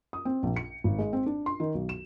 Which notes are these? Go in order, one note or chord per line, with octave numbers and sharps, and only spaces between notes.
D#6
C4
A#1
C#7
G#1
G#3
C4
D4
C6
D#3
B1
E7